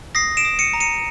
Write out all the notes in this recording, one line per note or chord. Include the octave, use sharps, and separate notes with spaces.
D#6 A#6 C7
D7 E7
D#6
C#7 D#7
A#5
C#7 D#7